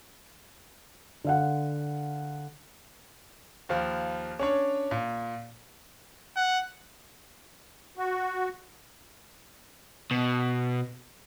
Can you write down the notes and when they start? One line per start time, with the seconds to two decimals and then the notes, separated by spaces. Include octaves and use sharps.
1.24 D3 F5 F#5
3.69 D#2 F3
4.39 C#4 D4 C#5
4.91 A#2
6.36 F#5
7.97 F#4
10.11 B2